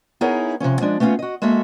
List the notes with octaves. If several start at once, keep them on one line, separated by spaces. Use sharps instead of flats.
B3 D#4 E4 G#4 A#4 C#5
C3 D#3 F3 C#4
F3 G#3 D4
A3 B3 C#4 D4 F4
F#4 D#5
G#3 A#3 F#4 A4 E5